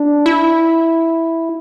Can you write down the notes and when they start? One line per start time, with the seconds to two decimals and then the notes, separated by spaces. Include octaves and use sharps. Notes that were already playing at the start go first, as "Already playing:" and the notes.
Already playing: D4
0.26 E4